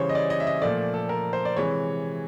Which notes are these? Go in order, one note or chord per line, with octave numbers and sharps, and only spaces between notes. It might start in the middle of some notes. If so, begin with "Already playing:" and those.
Already playing: C#3 E3 G3 C5 C#5
D#5
D5
D#5
E5
D#5
A#2 F3 A3 D5
A4
A#4
C5
D5
C3 E3 G#3 C#5